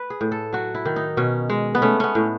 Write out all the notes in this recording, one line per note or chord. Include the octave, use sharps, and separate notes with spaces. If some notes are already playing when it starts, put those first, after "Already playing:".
Already playing: B4
G#4
A2
A4
F#3 F#4
E4
D#3
D#4
B2 C#4
G#3
B3
A3 C#4
B3 C#4
A2